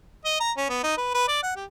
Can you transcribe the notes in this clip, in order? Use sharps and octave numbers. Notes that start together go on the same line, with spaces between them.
D#5
A#5
C#4
B3
D#4
B4
B4
D5
F#5
G4